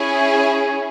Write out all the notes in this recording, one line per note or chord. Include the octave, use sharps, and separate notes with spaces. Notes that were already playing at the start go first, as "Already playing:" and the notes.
Already playing: C#4 E4 G#4